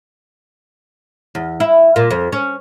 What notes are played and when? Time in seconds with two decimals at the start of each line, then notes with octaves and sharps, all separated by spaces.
1.35 E2
1.60 E4
1.96 A#2
2.11 F2
2.32 C#4